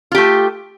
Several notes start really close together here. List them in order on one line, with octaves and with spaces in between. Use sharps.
F4 G4 A3